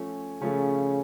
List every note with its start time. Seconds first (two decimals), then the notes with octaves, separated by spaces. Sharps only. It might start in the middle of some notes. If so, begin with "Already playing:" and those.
Already playing: F3 A3 C#4
0.42 C#3 F3 A3 C#4